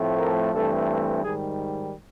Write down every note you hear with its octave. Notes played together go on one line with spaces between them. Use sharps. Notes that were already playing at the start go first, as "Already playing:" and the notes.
Already playing: A2 F3 A3 C4
A#4
G2 E3 A3 C4 A4
G#2 D#3 G3 G#4